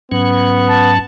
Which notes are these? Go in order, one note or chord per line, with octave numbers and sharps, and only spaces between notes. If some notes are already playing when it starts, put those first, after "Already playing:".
G#2 F#3 B3 C#4
A5